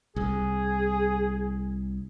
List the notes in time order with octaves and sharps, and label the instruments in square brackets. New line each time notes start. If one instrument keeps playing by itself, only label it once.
[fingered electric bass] C2 [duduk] G#4